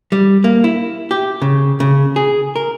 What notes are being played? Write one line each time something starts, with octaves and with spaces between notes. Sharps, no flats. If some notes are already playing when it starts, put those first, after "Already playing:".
G3
A#3
E4
G4
C#3
C#3
G#4
A#4